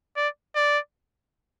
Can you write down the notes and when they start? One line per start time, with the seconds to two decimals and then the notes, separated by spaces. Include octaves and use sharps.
0.17 D5
0.56 D5